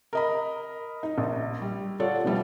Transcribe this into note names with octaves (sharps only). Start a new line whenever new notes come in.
A#4 D#5 B5
D#4
A#1
G3
F4 A4 C#5 D5 F#5
B2 F3 G3 A3